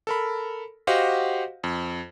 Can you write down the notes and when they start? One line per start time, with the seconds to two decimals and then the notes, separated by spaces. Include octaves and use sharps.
0.07 A4 A#4 B5
0.87 F#4 G4 C5 D#5 F5 F#5
1.64 F2